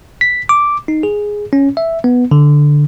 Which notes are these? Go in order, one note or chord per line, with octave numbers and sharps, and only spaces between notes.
B6
D6
D#4
G#4
C#4
E5
B3
D3